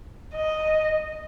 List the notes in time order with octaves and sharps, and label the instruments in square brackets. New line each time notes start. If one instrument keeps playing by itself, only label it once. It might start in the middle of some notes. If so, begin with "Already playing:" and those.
[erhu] D#5